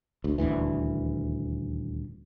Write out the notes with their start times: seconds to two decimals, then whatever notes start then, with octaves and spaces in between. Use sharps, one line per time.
0.24 D2
0.38 D#1 G#1 D2 E3